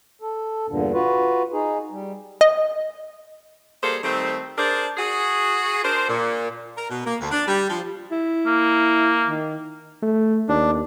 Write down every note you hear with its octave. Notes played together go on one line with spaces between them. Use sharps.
A4
E2 G2 A#2 D3
F4 F#4 B4
D#4 G#4
G3
D#5
G3 A#3 G#4 A4 C5
D#3 G3 A3 C4
D4 G#4 A#4 C5 D5
F#4 G#4
D4 A#4 C5
A#2
A#4
B2
A#3
D2
D4
G3
F3
E4
A#3
D#3
A3
D#2 D4